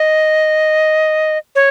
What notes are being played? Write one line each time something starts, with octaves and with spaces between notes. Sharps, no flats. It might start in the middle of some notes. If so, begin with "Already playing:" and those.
Already playing: D#5
C#5